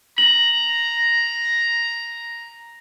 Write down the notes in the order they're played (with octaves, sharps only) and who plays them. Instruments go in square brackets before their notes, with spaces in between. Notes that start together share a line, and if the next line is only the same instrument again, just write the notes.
[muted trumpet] A#5 [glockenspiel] F#7